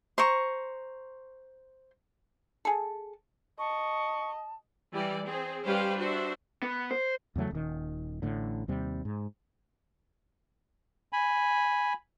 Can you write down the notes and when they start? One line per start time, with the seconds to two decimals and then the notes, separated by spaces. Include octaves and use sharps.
0.18 C5 A#5 C#6
2.65 G#4 A4
3.59 D#5 A5 C#6
4.93 E3 G3 D5
5.24 C4 G#4
5.65 G3 C#4 G4 B4 C5 F5
5.97 D4 F#4 C5 E5
6.63 B3
6.91 C5
7.36 E2 C#3 F#3 A3
7.51 D#1 D#3
8.22 A1 A2 D3
8.68 D#2 C3 G3
9.05 G#2
11.13 G#5 B5